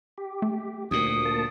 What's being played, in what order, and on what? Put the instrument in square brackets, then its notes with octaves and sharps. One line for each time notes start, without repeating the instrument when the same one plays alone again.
[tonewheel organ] G4
[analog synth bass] A3
[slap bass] D2 A#2 [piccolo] D#6
[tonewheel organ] A#3 A5